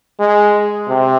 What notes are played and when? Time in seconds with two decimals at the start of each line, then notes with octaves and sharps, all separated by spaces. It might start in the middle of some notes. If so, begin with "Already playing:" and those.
0.20 G#3
0.89 C3